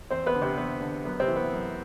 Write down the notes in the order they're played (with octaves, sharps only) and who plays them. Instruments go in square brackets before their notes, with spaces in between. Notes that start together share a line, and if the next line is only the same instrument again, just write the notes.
[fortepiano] E2 C4 C5
B3 B4
D3
C3 C4
E2 B3
D3
F#2 B3
C3 C4
E3
B3
F#2